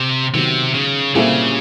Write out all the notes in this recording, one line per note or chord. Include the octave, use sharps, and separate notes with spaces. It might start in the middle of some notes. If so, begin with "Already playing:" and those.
Already playing: C3
C3 D#3 F#3 B3
C#3
A#2 C#3 G3 C4 E4 A4